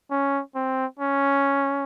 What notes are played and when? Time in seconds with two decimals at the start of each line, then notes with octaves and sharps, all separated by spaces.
0.11 C#4
0.55 C4
0.99 C#4